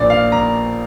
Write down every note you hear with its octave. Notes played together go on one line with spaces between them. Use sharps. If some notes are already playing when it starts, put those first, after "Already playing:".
Already playing: A#1 A#2 D5
F5
A#5